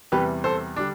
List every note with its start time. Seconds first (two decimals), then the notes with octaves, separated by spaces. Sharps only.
0.12 E2 C3 E3 G3 G4 B4
0.44 A4 C5
0.76 D3 G3 D4